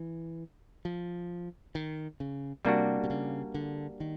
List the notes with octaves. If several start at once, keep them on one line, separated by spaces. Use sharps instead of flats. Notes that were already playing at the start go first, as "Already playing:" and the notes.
Already playing: E3
F3
D#3
C#3
C3 G3 A#3 D4 F#4
C3
C#3
D3
D#3